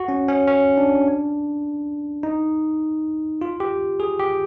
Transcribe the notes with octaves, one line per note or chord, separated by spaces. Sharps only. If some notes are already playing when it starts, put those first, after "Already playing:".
Already playing: F#4
C#4
C#4
C#4
D4
D#4
F4
G4
G#4
G4